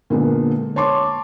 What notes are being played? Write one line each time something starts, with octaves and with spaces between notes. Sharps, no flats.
A#2 D3 G#3 A#3 B3
C#5 A5 C6 D6